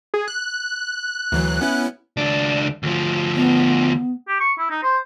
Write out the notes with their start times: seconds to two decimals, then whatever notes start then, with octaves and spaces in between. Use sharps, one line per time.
0.14 G#4
0.28 F#6
1.32 D2 E3 F#3
1.61 B3 C#4 E4
2.17 C#2 D4
2.83 D2 F3
3.36 B3
4.28 G4
4.40 C#6
4.59 E4
4.71 D#4
4.83 C5